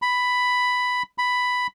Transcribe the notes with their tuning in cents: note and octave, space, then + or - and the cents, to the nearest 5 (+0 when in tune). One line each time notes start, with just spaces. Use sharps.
B5 +5
B5 +5